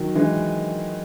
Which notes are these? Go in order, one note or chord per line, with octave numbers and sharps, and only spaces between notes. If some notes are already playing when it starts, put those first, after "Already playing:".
Already playing: D#3 F#3
E3 G#3